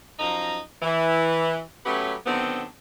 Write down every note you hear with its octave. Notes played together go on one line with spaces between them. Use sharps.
F#2 F3 D#4 A#5
E3
F#3 A3 B3 C#4 G4 B4
D3 D#3 F#3 B3 C4